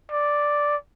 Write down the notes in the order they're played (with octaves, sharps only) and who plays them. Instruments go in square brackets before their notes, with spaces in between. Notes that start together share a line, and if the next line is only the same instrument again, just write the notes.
[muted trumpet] D5